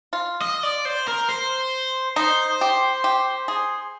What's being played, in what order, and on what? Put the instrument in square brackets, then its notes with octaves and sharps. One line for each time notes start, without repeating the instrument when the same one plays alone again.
[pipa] F4
[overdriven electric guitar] D#5
D5
C5
A#4
C5
[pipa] D#4 [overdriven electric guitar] C5
[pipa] G4
G4
G#4